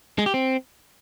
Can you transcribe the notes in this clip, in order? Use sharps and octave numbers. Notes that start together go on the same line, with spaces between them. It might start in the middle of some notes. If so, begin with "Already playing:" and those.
G#3
G4
C4